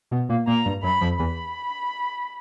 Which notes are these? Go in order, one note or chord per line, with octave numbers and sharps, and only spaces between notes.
B2 B3
A#2 A#3
A#2 A#3 A#5
G2 G3
F#2 F#3 B5
F2 F3
E2 E3 B5